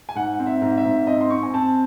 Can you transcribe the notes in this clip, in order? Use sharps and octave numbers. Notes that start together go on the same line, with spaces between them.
G#5
G#2 F#5
C4
E5
G#2
E5
G#2
C4 D#5
C6
C4 C#6
G#5
C4 A5